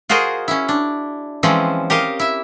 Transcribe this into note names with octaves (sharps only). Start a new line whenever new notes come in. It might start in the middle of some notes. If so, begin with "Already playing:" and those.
F4 F#4 G#4 A#4 C5 D#5
C#4 E4
D4
E3 F3 G#3 C4 C#4
G4 A#4 D#5 F5
E4 E5